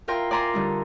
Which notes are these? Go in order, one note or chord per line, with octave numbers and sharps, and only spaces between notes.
E4 F4 A#4 G5 C6
D5 G#5 A#5 C6
D3 G3 D#4